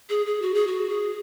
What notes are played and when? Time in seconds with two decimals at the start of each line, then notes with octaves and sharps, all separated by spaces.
0.10 G#4
0.26 G#4
0.42 F#4
0.54 G#4
0.67 F#4
0.89 G#4